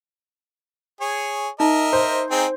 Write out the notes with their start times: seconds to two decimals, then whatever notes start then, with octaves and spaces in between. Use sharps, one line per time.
1.01 G#4 C#5
1.60 D#4 A#4 D#5 E5
1.93 C5 C#5
2.31 C4 D#4 G#4